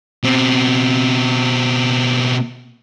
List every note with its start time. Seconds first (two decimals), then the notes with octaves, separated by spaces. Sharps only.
0.23 B2 C4